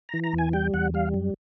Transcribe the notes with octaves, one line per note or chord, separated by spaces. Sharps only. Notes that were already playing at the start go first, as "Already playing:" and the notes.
E3 A#5
A#5
E2
G#5
G3 G5
E2 F#5
G3 F5
F#2